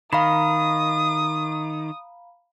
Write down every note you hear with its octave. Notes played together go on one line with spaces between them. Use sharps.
D#3 F5 A#5 B5 D#6